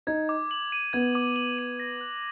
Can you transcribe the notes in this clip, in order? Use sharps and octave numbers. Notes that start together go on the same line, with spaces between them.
D#4 G#6
D6
F#7
D#7
B3 G#6
D6
F#7
D#7
A#6
F#6